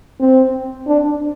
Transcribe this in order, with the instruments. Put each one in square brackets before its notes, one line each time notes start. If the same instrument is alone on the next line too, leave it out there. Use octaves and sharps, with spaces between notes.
[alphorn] C4
D4